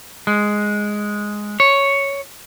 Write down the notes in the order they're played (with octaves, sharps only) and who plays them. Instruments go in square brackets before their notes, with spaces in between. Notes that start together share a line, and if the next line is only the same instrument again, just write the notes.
[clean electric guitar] G#3
C#5